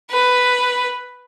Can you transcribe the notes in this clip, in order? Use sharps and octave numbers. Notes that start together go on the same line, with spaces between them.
B4